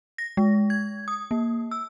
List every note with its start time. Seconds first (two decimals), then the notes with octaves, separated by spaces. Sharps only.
0.18 A#6
0.37 G#3
0.70 G#6
1.08 D#6
1.31 A#3
1.71 E6